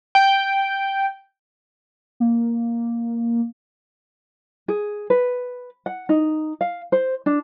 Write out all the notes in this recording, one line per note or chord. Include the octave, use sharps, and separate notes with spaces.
G5
A#3
G#4
B4
F#5
D#4
F5
C5
D4